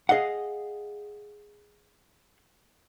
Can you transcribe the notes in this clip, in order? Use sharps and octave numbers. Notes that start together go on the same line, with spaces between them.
G#4 D#5 F5 F#5